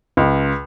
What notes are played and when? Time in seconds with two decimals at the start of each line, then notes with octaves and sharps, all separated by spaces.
0.17 C#2